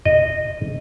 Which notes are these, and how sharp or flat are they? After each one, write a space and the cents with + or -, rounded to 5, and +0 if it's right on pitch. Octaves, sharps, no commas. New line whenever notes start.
D#5 -15